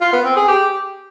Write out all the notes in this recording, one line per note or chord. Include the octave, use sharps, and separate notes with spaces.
F4
B3
C4
G#4
G4